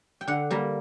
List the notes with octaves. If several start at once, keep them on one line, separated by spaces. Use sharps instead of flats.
G5
D3 F#5
G3 A#3